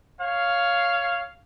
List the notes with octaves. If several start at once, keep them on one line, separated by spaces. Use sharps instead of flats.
C#5 F5